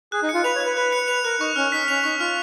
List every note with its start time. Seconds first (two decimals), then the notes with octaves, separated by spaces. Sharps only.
0.12 G#4 F#6
0.23 D#4
0.29 C#7
0.34 F4
0.44 B4 F7
0.55 C#5
0.60 F#6
0.66 B4
0.77 B4 F#6
0.92 C#7
1.08 B4 F7
1.24 A#4 F#6
1.40 D#4 C#6
1.56 C#4 F6
1.72 D#4 B6
1.88 C#4 F7
2.04 D#4 C#6
2.20 F4 F6